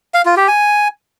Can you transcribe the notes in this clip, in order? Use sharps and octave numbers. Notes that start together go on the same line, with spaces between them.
F5
F4
G4
G#5